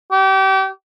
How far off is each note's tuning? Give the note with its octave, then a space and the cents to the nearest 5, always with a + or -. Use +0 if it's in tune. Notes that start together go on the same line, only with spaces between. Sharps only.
G4 -35